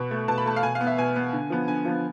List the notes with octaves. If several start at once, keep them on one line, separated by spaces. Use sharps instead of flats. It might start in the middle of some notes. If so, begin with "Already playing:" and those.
Already playing: B2 B5
A3
B2 A5
B5
A3 A5
F5
B2 G#5
F5
B3
E5
B2 G#5
B3
D3
F3 B3
D3 G#5
F3 B3